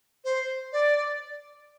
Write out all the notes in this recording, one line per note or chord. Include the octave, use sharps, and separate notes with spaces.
C5
D5